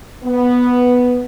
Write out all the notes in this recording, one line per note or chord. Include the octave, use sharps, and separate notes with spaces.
B3